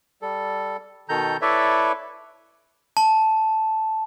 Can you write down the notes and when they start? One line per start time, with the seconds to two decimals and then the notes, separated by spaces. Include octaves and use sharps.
0.22 G3 A4
1.09 B2 D#3 A4 A#5 G6
1.42 E4 A4 B4 C#5 D5 E5
2.97 A5